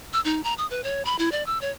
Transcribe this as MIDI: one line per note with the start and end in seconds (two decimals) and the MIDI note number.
0.13 0.21 88
0.25 0.43 63
0.44 0.54 82
0.58 0.66 87
0.70 0.81 71
0.84 1.03 73
1.05 1.16 83
1.19 1.30 64
1.32 1.45 74
1.46 1.60 88
1.61 1.71 73